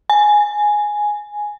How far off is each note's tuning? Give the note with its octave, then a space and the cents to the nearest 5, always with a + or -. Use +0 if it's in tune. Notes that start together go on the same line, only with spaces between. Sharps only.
G#5 +5